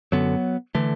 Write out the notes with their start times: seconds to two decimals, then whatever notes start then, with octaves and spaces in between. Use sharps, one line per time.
0.12 F#2 D3 F#3 B3
0.75 D3 E3 A3